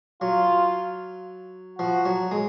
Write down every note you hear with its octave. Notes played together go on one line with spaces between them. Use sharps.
F#3 F4
F3 F#4
F#3
G#3